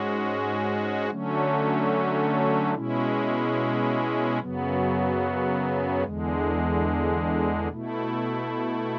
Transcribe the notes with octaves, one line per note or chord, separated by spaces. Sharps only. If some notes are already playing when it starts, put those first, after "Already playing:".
Already playing: G#2 G#3 C#4 F#4
D3 F#3 A3 C#4
B2 G#3 C#4 E4
F#2 C#3 F#3 B3
E2 D3 G#3
B2 A3 E4